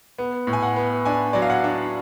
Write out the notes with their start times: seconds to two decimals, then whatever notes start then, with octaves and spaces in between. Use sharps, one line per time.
0.19 B3
0.47 A2
0.53 G#5
0.63 F#5
0.76 B3
1.05 D4 G#5
1.33 F#3 D5
1.42 F5
1.50 F#5
1.64 D4